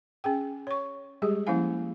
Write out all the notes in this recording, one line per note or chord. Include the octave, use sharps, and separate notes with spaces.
C#4 G#4 G5
C#5 C#6
G3 G#3 G4 G#4
F3 A#3 C#4 E4 F5 G#5